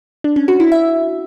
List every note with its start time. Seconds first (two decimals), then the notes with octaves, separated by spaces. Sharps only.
0.24 D4
0.36 C#4
0.48 F#4
0.60 E4
0.72 E5